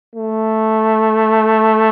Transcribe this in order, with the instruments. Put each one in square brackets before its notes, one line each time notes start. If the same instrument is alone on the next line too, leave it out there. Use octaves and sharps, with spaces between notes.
[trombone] A3